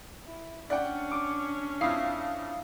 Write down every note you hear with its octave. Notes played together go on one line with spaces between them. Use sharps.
E4
C#4 D4 D5 F#5 G5
D6
F2 E4 F5 D#6 C7